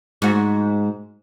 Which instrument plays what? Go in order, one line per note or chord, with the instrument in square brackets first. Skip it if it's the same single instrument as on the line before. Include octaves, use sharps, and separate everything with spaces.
[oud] G#2 F#4